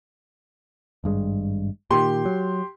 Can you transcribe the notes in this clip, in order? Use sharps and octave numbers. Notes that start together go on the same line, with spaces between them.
G#1 G2 G#3
A#2 D#3 G4 C6
F#3